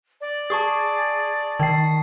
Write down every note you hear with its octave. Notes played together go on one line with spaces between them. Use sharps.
D5
G#4 A5 C#6 D#6
D#3 A5 C7